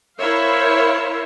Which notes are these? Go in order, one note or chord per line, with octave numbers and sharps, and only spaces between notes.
E4 A#4 C5 C#5 E5 F5